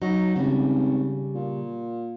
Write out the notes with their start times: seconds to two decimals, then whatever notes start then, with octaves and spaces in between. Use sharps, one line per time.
0.02 F#3 D#4
0.36 G#1 C#3 G3
1.35 A#2